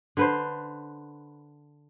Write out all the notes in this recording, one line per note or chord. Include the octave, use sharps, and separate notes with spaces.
D3 B4 C5